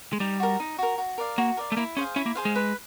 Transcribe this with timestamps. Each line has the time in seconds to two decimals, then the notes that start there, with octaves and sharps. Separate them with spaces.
0.13 G#3
0.20 G3 D#4
0.40 F#4 A#4
0.60 D#4
0.78 F#4 A#4
0.98 F#4
1.18 A#4 D5 F5
1.38 A#3 F#4
1.57 A#4 D5 F5
1.72 A3
1.77 A#3 E4
1.97 C#4 G#4 C5 F5
2.16 C#4 E4
2.26 A#3
2.35 G#4 C5 F5
2.45 G#3
2.55 B4